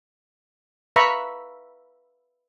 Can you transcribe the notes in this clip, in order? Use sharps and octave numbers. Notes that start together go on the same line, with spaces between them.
B4 E5 F5 A#5 B5 C#6